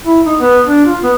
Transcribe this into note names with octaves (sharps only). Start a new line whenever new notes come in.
E4
D#4
B3
D4
F4
B3